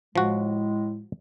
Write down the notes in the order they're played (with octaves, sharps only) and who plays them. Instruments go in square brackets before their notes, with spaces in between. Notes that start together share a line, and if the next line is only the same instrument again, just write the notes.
[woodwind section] A2 G#3 [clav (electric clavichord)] F3 F#4